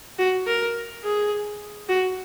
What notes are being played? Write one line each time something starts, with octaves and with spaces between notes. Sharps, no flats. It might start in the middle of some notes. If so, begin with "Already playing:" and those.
F#4
A#4
G#4
F#4